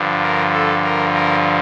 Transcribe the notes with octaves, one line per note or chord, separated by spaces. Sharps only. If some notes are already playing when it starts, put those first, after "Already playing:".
Already playing: G2 D3 F3
A#4
A4
A#4
A#4